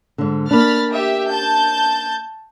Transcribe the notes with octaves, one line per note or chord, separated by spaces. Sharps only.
G#2 D3
A#3 D4 B5 F6 A6
G4 E5
A5 G6